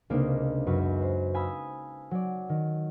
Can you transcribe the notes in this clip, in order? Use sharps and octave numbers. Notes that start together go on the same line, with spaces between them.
C#2 C3 A#3 D4 D#4 D7
F#2 F#3 B4 C#6
B4 C5
F5 G#5 A5 B5 D#6 E6
F#3 D5
D#3